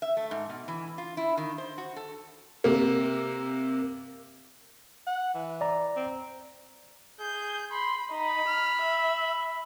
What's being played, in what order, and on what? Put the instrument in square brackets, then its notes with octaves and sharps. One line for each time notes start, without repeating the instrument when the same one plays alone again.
[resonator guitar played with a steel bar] E5
A3
G#2
B2
E3
F4
E4
D#3
C5
F#4
A4
[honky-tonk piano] C3 A#3
[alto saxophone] F#5
E3
[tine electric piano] D5 A#5
[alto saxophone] C4
[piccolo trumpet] G#4 [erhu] G6
[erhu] B5 [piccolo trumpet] C6
[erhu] D#4 [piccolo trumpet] B5
[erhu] F6
E5